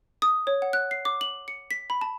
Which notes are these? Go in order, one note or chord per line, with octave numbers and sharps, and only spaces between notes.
D#6
C#5
F#5
F#6
C7
D6
F#7
C#7
B6
B5
A5